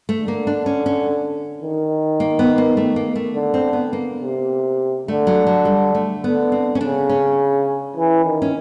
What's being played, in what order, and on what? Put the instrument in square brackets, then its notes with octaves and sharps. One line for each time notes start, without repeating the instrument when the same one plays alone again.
[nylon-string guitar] A3
[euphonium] D3
[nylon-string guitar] A#3
D4
C#4
C#4
[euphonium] D#3
[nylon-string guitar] A#3
B3
A#3
A3
A#3
A3
[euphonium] D3
[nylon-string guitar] C4
B3
A#3
[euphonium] C3
[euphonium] D3 [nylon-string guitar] A3
[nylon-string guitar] F#3
F#3
G3
A3
[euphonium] D3 [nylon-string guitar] B3
[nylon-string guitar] C4
C#4
[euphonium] C#3 [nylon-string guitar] D4
[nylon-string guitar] C#4
[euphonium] E3
D#3
[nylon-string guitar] C#4